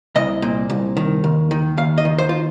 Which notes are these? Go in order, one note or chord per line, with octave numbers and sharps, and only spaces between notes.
C2 D#5
A#2
C2
D#3
D#2
D#3
D#2 F5
D#5
D#3
C5
F4